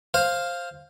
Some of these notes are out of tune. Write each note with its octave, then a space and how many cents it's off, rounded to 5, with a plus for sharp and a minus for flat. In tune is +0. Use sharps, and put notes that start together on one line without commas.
C5 +10 F5 +0